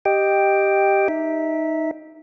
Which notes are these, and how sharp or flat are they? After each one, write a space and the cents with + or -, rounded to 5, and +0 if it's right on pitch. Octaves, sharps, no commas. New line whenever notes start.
G4 +0 D#5 -5 G5 +5
D#4 +0 E5 -15